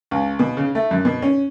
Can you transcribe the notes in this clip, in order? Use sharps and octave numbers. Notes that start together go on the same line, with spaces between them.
C#2
B2
C#3
A3
F#2
B2
C#4